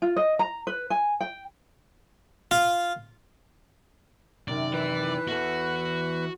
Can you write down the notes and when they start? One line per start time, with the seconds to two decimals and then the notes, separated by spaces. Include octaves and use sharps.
0.02 F4
0.16 D#5
0.39 A#5
0.67 B4
0.90 G#5
1.21 G5
2.51 F4
4.48 F#2 C3 D#3 D5
4.73 E3 B4
5.28 E2 F#4 A4